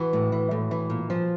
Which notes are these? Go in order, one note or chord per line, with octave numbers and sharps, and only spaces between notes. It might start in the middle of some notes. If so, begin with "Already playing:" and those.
Already playing: E3 F#4
A2
E3
A2
E3
A#2
F3